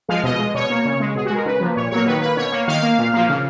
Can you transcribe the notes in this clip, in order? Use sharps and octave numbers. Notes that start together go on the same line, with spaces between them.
F3 G#3 F5
B2 D#5
G#3
B2 C#5
A#3
C#3
G#3
B2 G#4
F#4
G#3
A#4
C#3 B4
F3 A#3
A#2 C#5
F#3 A#3 C#5
D#3 B4
A#3 B4
B2 C#5
A#3
D#3 F5
A#3
A#2
F3 A#3
C#3